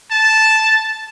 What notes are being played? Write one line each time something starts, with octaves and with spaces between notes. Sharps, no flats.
A5